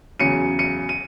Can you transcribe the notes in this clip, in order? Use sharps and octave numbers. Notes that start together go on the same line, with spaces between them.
E2 C#3 F#3 C#7 D#7
C#7 D#7
D#7